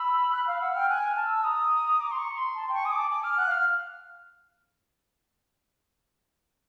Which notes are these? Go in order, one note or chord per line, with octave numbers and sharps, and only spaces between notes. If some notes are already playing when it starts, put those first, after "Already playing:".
Already playing: B5 E6
F#6
F5 F6
F#5 E6
G5 F6
G#5 F#6
F6
A5
E6
A#5 D#6
D6
C6
C#6
C6
A5
C6
G5 C#6
G#5 D#6
D6
A5
G#5 D6
F6
F#5 F#6
F5
F6